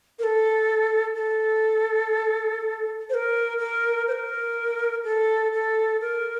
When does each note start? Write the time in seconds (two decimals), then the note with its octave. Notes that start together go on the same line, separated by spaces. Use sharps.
0.19 A#4
0.24 A4
1.15 A4
3.10 C5
3.14 A#4
3.59 A#4
4.08 C5
4.12 A#4
5.04 A4
5.53 A4
6.01 A#4